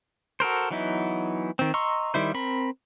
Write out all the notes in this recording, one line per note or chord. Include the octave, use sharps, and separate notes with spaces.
F#4 A4 A#4 C5
E3 F#3 B3 D#4 E4
D#3 C4
D#5 A#5 C6 C#6 E6
D#3 G3 E4 C5
C4 A#4 B5